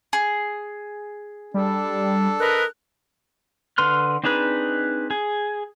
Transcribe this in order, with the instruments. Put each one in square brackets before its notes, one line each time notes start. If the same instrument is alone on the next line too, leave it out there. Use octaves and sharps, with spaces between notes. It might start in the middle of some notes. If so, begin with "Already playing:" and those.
[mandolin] G#4
[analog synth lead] G3 [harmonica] D4 A4
[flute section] A#4 B4 D#5 [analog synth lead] F#6
[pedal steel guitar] D3 B4 C6 F6
C4 D4 D#4 G#4 B4
G#4